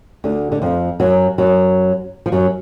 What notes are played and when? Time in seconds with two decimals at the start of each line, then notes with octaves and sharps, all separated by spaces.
0.24 D2 D3
0.52 D3
0.62 F2 F3
1.00 F#2 F#3
1.38 F#2 F#3
2.26 F3
2.32 F#2 F#3